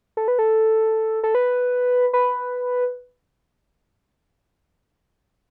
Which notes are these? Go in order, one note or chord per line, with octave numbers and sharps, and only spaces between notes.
A4
B4
A4
A4
B4
B4